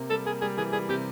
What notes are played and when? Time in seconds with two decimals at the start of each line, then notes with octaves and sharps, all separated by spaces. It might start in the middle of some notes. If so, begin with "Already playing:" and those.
Already playing: C3 A#3
0.10 G3 A4
0.25 A#3 G#4
0.41 G3 G#4
0.57 E3 G#4
0.72 G3 G#4
0.89 C3 G4